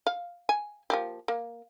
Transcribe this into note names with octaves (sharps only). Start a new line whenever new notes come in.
F5
G#5
F3 A#3 G4
A#3